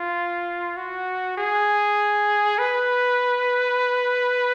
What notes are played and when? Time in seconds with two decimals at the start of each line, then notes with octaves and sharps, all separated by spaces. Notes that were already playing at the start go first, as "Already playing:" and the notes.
Already playing: F4
0.77 F#4
1.38 G#4
2.59 B4